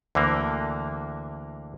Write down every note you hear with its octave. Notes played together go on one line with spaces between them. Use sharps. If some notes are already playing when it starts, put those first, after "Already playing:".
D2 D3 E3 A#3